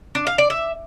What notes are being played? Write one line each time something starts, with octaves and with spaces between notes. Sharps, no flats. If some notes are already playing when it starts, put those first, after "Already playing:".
D4
F5
D5
E5